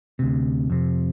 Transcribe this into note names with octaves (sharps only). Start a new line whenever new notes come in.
D2 C3
F2 C3